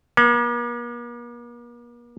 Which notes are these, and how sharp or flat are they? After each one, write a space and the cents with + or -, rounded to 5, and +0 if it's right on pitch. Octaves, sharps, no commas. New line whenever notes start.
A#3 +45